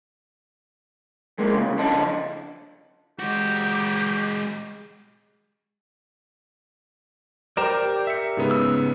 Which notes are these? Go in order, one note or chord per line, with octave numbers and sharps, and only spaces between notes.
E2 G#3 A#3
C2 C#3
C#3 F3 D4 D#5 A5
G#3 F#4 G4
G4 A#4 C5 D5 A#5 E7
E5 C#7
G#2 C#3 B3
E6